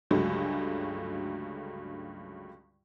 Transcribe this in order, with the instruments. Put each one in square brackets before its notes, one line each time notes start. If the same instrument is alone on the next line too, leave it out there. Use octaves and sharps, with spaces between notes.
[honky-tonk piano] C#2 G2 D3 F#3 G#3 A3